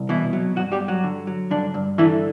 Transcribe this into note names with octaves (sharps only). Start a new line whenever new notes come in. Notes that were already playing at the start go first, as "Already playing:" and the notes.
Already playing: C2
B2 E3 E4
F#3
G2 F#3 F#4
G3 G4
G2
F#3 F#4
D3
F#3
G2 D3 D4
G2
D3 E3 E4